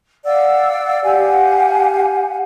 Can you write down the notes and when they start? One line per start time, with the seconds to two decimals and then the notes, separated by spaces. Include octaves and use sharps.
0.25 D5 F5 F#5 E6
1.04 G4 F5 F#5 G#5